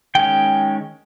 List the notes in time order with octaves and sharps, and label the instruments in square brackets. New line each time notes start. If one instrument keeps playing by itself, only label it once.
[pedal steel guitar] D#3 G#3 C#4 G5